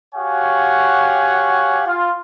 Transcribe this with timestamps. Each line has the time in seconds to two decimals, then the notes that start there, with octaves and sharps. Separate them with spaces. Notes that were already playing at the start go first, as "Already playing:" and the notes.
0.15 F#4 G4 C#5 F5 F#5 G#5
1.87 F4